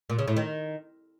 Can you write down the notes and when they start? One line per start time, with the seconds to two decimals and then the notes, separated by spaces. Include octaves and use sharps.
0.10 A#2
0.19 C#3
0.28 A2
0.37 D#3